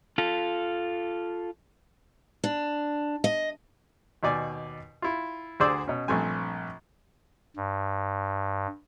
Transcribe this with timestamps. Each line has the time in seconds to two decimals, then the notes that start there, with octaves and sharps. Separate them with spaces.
0.18 F4 A4
2.44 D4
3.24 D#5
4.23 D#2 B2 D5 G#5
5.02 E4 F4
5.60 D2 D3 G#4 C5 D5 E6
5.88 B2 C#4
6.08 A#1 G2 A3 C4 G#5
7.56 G2